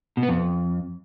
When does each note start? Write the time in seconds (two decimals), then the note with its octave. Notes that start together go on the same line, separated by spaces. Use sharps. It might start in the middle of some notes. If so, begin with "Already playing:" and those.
0.17 B2
0.23 B3
0.28 F2